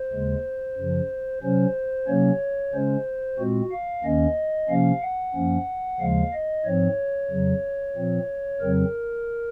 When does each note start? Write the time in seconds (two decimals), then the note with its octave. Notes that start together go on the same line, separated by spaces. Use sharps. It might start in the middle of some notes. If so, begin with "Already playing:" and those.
Already playing: C5
0.12 D#2 C#3 G#3
0.78 F#2 C#3 F3
1.43 C3 F#3 C#4 C5
2.08 C3 F#3 A#3 C#4 C#5
2.74 C#3 G#3 C#4 C5
3.39 A#2 G#3 C4 F#4
3.72 F5
4.04 D#2 D#3 A#3 C#4 D#5
4.69 C3 F3 A#3 C#4 F5
5.02 F#5
5.35 F#2 F3 A#3 C#4
6.00 D#2 C#3 F3 G#3 F5
6.33 D#5
6.65 G#2 F3 C4 C#5
7.31 F2 C#3 F#3
7.96 A#2 F3 C4
8.61 F2 C#3 F#3 C4 A#4